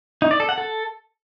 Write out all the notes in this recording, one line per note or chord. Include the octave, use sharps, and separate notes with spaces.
D#4
D5
A4
F#5
A4